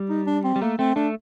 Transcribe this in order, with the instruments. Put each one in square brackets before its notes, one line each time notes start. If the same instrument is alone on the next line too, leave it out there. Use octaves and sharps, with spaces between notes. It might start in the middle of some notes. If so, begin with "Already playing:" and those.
Already playing: [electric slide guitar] G3
[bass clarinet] D#4
D4
C4
[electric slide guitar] G3
[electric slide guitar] A3 [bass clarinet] A#3
[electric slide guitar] A3 [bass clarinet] C4
[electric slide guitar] A3 [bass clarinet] D4